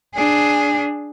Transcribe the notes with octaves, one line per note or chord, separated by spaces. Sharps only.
D4 G#4